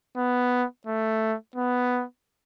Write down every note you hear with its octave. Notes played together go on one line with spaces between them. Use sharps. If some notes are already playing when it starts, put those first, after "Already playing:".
B3
A3
B3